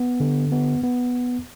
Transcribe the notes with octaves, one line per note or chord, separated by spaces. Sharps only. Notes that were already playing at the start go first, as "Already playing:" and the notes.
Already playing: B3
D3
B3
B3